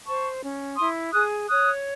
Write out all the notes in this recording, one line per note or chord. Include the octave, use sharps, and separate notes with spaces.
C5 A5 C#6
C#4
E4 C6 D#6
G#4 D#6 F#6
C#5 D#6 F#6